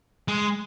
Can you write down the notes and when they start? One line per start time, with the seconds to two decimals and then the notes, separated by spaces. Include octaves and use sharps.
0.28 G#3